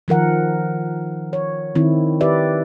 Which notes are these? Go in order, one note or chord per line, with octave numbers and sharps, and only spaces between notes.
D#3 F3 A#4 F#5
C#5
D#3 C4 E4
G4 B4 D5 E5